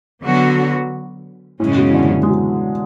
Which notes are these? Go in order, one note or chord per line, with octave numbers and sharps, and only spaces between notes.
D3 F#3 B3 F#4
F#2 A2 C#3 G#3 C#4
B2
E3
D3
E3
G#3
F#3